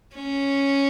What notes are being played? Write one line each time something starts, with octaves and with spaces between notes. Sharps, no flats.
C#4